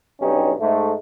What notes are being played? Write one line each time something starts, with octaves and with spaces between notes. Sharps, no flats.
B1 G2 C#4 D#4 G4
G#2 A3